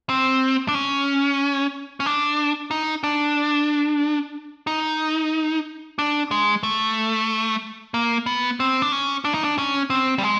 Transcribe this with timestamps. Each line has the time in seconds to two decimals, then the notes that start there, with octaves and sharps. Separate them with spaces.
0.09 C4
0.68 D4
0.74 C#4
2.00 C#4
2.06 D4
2.71 D#4
3.03 D4
4.67 D#4
5.99 D4
6.31 G#3
6.63 A3
7.94 A#3
8.26 B3
8.60 C4
8.82 D4
8.92 C#4
9.25 D4
9.34 D#4
9.44 D4
9.58 C#4
9.90 C4
10.18 G3
10.23 G#3